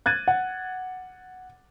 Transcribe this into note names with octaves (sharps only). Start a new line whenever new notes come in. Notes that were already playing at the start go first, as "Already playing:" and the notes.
F#6 G#6 A6 D#7
F#5